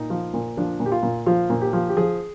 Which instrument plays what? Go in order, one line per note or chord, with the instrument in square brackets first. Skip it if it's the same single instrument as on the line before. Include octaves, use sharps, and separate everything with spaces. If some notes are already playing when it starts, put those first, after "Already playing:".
Already playing: [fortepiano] A#2 D#4
F3
A#2
F3 D4
A#2
G4
F4
A#2
F3 F4
A#2
G4
F3
G4
F3 G#4